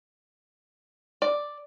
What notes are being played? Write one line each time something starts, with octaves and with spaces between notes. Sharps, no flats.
D5